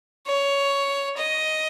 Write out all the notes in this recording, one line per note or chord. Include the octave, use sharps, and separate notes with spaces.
C#5
D#5